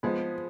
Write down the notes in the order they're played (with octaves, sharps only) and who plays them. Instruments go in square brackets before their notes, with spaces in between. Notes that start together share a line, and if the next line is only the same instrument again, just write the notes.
[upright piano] F3 [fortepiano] G#3 B3